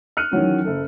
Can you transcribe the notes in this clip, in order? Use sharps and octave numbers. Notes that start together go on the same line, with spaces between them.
F6 F#6 C#7 D#7
D#3 E3 F#3 C#4
F#1 A4